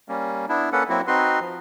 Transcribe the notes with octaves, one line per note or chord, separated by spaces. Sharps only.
G3 A#3 C#4
B3 D4 E4
A#3 C#4 A4 B4 F#5
F#3 A#3 C4 E4 F#4
C4 D#4 F#4 B4 C6
F3